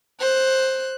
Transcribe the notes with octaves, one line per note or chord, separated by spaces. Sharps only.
C5 F#6